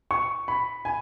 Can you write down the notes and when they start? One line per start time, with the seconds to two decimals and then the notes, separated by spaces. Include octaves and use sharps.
0.11 C#6
0.48 B5
0.85 G#5